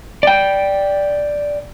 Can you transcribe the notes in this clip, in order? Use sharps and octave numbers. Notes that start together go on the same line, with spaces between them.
D5 G5